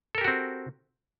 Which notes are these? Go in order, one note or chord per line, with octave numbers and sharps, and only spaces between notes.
C4 F#4 G4 A4 A#4